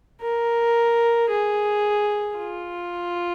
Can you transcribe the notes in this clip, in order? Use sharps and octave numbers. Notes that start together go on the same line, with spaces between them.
A#4
G#4
F4